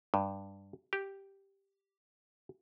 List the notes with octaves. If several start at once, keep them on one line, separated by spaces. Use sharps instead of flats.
G2
G4